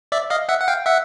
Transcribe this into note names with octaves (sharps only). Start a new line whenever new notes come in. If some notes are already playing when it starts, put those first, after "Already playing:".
D5 E5
D#5 F5
E5 F#5
F#5
F5 G5
E5 F#5